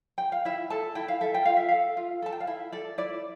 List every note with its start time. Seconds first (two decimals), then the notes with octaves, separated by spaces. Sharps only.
0.18 G5
0.32 F5
0.45 E4 E5
0.70 A4 A5
0.95 E4 G5
1.08 F5
1.21 A4 E5
1.34 G5
1.45 F4 F5
1.57 E5
1.68 A4 F5
1.97 F4
2.22 A4 A5
2.32 G5
2.40 F5
2.47 E4 E5
2.72 A4 D5
2.98 E4 D5